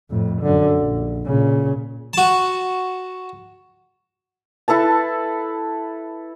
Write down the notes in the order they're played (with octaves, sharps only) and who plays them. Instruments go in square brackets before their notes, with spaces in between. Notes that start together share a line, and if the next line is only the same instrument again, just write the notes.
[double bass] F2 A2
F#2 D3
A#1
A#2 C#3
[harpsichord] F#4 A5
[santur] E4 A4 B4 A5